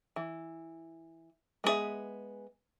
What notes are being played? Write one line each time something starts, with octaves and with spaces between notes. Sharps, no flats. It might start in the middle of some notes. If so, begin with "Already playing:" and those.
E3
G#3 B3 C4 G#4 E5